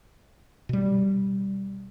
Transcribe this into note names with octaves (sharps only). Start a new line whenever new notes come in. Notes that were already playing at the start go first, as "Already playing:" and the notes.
B2 G3